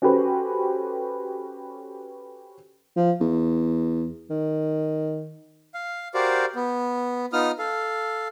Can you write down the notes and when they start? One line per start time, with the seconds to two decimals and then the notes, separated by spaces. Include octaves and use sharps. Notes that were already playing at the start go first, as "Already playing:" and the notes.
0.02 C#4 F#4 G4 A4 B4 C5
2.97 F3
3.20 E2
4.30 D#3
5.74 F5
6.14 F#4 G4 A#4 C5 D5 F5
6.55 B3
7.33 B3 D#4 F4 D#6 F6
7.59 A4 F5